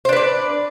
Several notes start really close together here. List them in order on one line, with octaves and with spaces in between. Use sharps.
C5 D4 B4 D5